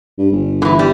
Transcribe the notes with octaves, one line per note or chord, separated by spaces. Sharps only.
G2
G1
D3 E3
G3